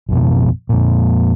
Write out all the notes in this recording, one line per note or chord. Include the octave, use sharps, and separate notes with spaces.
A1 F2 B2
F2 A#2